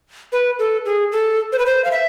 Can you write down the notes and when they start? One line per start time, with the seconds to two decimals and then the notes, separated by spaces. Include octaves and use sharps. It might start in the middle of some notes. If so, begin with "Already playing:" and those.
0.32 B4
0.59 A4
0.85 G#4
1.12 A4
1.52 C5
1.59 B4
1.66 C5
1.85 F5
1.91 E5